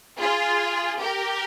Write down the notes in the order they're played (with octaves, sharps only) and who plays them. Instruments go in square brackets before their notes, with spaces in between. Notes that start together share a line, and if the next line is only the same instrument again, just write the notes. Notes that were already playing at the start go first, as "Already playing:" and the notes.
[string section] F4 G#4
G4 A#4